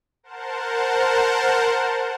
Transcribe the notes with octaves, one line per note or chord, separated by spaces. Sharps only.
A#4 C5 F#5 A5